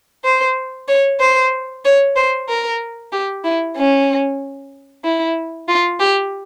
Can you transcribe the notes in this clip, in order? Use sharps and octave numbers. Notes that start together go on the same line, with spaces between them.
C5
C#5
C5
C#5
C5
A#4
G4
E4
C#4
E4
F4
G4